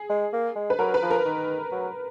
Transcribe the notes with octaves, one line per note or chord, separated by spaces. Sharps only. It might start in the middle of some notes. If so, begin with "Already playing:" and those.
Already playing: G#4
G#3
A#3
G#3
B4
F#3 A#4
B4
F3
A#4
D#3
F#3